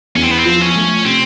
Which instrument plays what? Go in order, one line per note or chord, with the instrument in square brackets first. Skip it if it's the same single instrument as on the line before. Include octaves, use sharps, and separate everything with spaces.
[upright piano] E2 [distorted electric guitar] C#4
[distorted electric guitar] C4
B3
C4
[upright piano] F3
[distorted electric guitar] C#4
[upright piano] A3
[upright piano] C3 [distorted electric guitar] C4